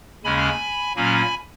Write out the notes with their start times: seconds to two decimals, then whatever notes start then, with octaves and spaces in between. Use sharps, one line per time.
0.24 D#2 C#3 G#3 C#4 G#5 B5
0.96 A#2 F#3 A#3 C#4 G#5 B5